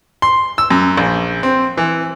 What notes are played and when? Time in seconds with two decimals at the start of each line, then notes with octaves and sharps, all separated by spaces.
0.22 C6
0.58 E6
0.70 F#2
0.97 A#1
1.43 C4
1.77 E3